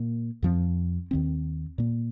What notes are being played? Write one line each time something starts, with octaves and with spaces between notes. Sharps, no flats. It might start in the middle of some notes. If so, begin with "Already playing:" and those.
Already playing: A#2 A#3
F2 F3 C4
D#2 D#3 C4
A#2 A#3